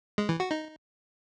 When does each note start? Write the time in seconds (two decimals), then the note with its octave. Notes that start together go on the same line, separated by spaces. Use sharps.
0.18 G#3
0.29 E3
0.40 F#4
0.51 D#4